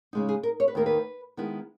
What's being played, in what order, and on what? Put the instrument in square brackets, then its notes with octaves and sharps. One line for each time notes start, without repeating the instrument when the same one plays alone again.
[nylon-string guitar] C#3 G#3 D#4
G#4
A#4
C#5
B4
D#2 D#3 A#3 D#4 A#4
B4
D#3 G#3 B3 E4